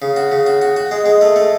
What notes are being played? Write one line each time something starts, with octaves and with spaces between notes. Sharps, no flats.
C#3
F#4
C#3
F#4
F#4
F#4
G#3
G#3
A3
A3